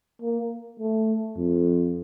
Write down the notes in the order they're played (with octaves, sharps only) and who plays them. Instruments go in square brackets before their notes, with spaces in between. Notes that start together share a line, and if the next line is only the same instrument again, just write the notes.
[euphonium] A#3
A3
[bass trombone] F2